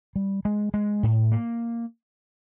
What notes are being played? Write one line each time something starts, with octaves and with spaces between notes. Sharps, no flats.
G3
G#3
G#3
A2
A#3